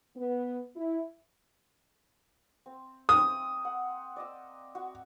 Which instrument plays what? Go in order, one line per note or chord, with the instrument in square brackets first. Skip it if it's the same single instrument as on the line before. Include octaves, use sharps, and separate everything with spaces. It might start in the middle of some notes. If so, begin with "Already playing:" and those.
[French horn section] B3
E4
[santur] C4
[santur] A#3 C4 [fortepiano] D#6
[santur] F#5
D5 D#5 E6
F#4